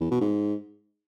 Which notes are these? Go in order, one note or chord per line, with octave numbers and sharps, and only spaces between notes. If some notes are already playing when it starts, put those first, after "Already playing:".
E2
B2
G#2